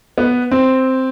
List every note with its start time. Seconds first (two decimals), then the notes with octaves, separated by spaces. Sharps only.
0.18 B3
0.51 C4